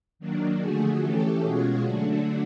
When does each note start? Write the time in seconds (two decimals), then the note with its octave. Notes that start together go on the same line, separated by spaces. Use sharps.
0.19 D#3 F#3 A#3 D4
0.60 D3 F3 A3 F#4 G#4
1.02 E3 A3 C#4 G4 A4
1.43 B2 G#3 C#4 F4 F#4 G#4
1.84 D3 F#3 A3 D4 F#4